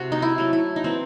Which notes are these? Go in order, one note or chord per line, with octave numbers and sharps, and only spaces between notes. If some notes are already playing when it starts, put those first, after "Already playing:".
Already playing: C3 A3 F#4
D#4
E4
F#3 A3
E4
D#4
E3 C4